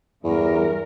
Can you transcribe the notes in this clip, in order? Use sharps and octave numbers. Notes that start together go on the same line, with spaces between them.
E2 G2 A#4